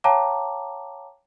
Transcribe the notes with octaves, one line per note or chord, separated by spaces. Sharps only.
C#5 F5 G5 A5 A#5 D6